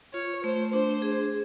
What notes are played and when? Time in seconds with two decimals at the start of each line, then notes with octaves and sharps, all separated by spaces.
0.13 F4 C#5
0.44 A3 C5
0.73 D4 C5
1.02 G#4